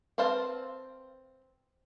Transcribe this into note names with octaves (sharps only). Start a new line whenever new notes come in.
C4 B4 C5 F5 A5